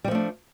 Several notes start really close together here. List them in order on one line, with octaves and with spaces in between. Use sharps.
G3 F3 A3 D4